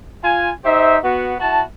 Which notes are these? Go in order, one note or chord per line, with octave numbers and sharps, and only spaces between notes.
F4 G#5
D#4 G4 C5 E5
B3 F#4
E4 F#4 A5